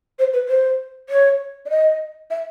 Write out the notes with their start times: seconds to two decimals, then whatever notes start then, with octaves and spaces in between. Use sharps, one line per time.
0.19 C5
0.33 B4
0.48 C5
1.09 C#5
1.66 D5
1.70 D#5
2.30 E5